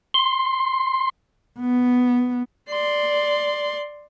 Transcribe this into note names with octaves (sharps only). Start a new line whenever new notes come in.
C6
B3
D5 C6